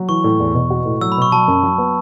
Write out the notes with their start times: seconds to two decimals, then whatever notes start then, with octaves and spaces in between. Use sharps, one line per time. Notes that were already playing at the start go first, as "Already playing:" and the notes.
Already playing: F#3
0.09 E3 C#6
0.24 A2
0.40 E2
0.54 B2
0.70 F#4
0.86 A2
1.01 F#3 E6
1.12 B5
1.17 B2 C#6
1.32 F#3 A5
1.48 F#2
1.63 F#3
1.78 B3